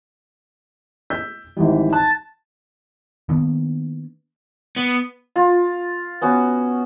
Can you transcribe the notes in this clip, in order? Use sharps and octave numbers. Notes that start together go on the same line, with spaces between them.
E6 G6 B6
G#1 E3 G3
A5 F#6
D#3 A#3 B3 D4
B3
F4
B3 C#4 F#4